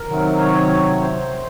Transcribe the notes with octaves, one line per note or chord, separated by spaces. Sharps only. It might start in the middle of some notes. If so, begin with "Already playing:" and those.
Already playing: A#4
C3 D#3 F#3
C#5
C5